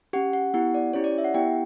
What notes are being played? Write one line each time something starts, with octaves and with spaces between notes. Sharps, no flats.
C#4 G4 F#5
F#5
B3 E4 G4 F#5
D5
C#4 E4 G4 C#5
D5
E5
F#5
B3 E4 G4 G5